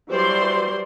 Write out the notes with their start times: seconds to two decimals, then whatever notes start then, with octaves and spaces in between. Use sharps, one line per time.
0.10 E3 F#3 G3 C5 D5 C6